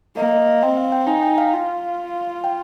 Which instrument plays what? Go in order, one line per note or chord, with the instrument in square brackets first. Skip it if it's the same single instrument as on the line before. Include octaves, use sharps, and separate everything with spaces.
[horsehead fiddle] A#3 [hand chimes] D#5
[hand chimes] D#5
F5
[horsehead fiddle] C4 [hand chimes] G5
[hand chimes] F5
G5
[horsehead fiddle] D#4 [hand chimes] G#5
[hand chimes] G5
F5
[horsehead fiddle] F4
[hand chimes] G5